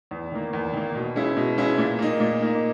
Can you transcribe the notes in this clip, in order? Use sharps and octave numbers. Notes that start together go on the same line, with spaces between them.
E2
D#3 A#3
E2
D#3 A#3
B2
G#3 C#4 E4
B2
G#3 C#4 E4
A#2
A#3 D#4
A#2
A#3 D#4